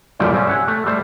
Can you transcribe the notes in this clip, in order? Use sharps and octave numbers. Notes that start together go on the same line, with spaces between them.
F#2 A#2 F3 G3 A3 G5
G3 C4 C#4
E5 F#5 G#5
A3
G3 A3 C5